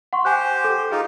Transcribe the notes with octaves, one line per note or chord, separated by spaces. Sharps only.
F#5 C6 C#6
G4 C5 F#5 G#5 F#6
A4
D#4 F4 G#4